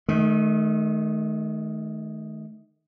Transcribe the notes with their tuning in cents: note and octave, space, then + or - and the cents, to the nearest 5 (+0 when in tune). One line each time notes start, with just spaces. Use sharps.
D#3 -5 A3 -40